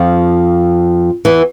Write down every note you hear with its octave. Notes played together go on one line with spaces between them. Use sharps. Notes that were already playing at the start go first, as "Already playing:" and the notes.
Already playing: F2 F3
E2 E3